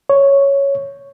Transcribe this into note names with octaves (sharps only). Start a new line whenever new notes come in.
C#5